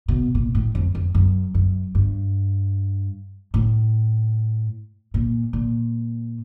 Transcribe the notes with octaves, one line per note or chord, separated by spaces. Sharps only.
B2
A#2
A2
F2
F2
F#2
F#2
G2
A2
A#2
A#2